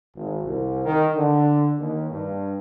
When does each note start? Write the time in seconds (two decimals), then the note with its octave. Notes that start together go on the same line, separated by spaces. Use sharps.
0.15 G#1
0.44 C2
0.84 D#3
1.16 D3
1.79 D#2
2.10 G2